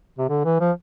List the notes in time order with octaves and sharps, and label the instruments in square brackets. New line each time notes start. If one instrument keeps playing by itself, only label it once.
[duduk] C3
D3
E3
F3